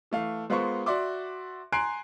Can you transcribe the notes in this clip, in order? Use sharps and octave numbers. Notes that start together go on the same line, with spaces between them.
E3 A3 F5
G#3 B3 F4 A#4 C5 C#6
F#4 D5 E5 C6 D6
G#5 A#5 C6 F#6 C7 D7